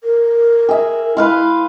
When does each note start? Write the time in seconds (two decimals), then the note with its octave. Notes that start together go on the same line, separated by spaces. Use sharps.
0.04 A#4
0.69 G#4 E5
1.17 E4 B4 F5 C6